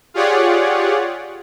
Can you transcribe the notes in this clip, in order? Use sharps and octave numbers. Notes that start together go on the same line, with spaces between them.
F4 G4 G#4 C#5 D5 F#5